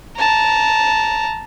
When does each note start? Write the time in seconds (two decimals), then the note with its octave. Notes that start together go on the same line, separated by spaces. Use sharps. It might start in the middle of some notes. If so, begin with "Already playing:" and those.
0.16 A5 A#5